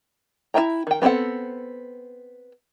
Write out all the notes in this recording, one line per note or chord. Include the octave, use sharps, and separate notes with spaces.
E4 B4 E5 G5 A#5
D#3 G5
B3 C4 F#4 A4 F#5